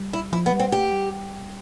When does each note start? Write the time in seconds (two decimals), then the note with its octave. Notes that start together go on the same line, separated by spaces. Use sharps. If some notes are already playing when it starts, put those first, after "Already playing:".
Already playing: G3
0.13 E4
0.33 F3 E4
0.46 B3
0.53 G3
0.59 C4
0.72 A3 G4
0.92 G3